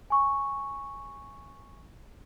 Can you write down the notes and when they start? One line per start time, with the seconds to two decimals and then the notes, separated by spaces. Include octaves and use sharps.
0.10 G#5 C#6